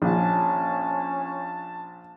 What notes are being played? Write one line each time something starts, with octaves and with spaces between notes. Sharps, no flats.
A#1 C#4 A5